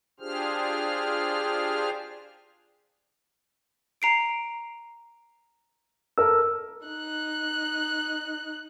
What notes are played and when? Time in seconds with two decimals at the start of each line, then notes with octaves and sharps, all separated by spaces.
0.20 D4 F4 G4 G#4 C5 F6
4.02 A#5 C7 D7
6.18 A4 A#4 E6
6.87 D#4 F#6